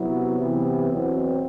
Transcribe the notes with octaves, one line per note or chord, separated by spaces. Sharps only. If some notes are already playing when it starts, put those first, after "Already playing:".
Already playing: C3 F#3 B3 E4
C3 E3 B3 E4 G4
E2 B2 F#3 C4